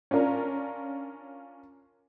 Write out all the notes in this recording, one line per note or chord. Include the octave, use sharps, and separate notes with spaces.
C#4 D4 F4 A#4